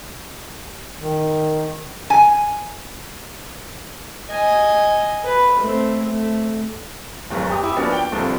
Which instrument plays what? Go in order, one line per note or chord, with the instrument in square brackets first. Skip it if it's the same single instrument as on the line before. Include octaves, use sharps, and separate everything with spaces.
[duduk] D#3
[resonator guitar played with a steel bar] G#5
[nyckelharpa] D#5 G#5
B4
A3 C4
A3
[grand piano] D1 G1 F#2
G4 D#6
E4 G4
F3 A#3 B3 C#4 D4 F#4
G5 G7
G1 C2 D3 F3